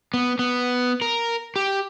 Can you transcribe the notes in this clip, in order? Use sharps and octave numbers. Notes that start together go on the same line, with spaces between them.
B3
B3
A#4
G4